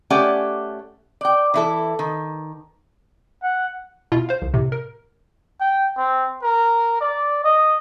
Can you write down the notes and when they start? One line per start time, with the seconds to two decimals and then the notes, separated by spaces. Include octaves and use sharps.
0.10 A3 C#4 G4 D5 F#5 G#5
1.21 D5 G5
1.54 E3 E4 A4
1.99 D#3
3.43 F#5
4.12 B2 E4 F4
4.29 C5 F5
4.42 C2
4.54 A2 C3
4.72 A#4
5.61 G5
5.97 C4
6.42 A#4
7.01 D5
7.44 D#5